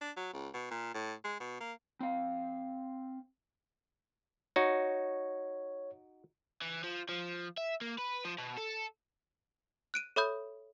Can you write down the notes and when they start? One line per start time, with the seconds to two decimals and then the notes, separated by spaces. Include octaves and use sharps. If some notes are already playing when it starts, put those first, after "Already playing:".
0.01 D4
0.17 F#3
0.33 C#2
0.54 B2
0.71 A#2
0.94 A2
1.24 G#3
1.40 B2
1.60 A#3
2.00 C4 F5
4.56 D#4 F#4 C#5
6.62 E3
6.83 F3
7.09 F3
7.58 E5
7.81 A#3
7.98 B4
8.25 F3
8.38 B2
8.57 A4
9.94 F#6 D7 D#7
10.16 A4 C#5 E5 B5 D#6 G6